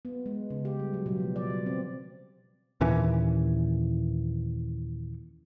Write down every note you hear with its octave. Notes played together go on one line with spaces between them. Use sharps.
B3
G#3
C#3
G4
G3
F#3
B2
F3
D5
G3
C4
D#2 A#2 E3 C#4